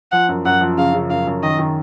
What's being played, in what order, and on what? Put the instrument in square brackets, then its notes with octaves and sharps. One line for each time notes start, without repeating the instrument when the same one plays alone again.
[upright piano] F3 [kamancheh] F#5
[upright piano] F#2
[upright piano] F#2 [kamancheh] F#5
[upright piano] F3
[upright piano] C#3 [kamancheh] F5
[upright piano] C#3
[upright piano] F#2 [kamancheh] F5
[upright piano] F#2
[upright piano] D#3 [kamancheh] D#5
[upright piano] D#3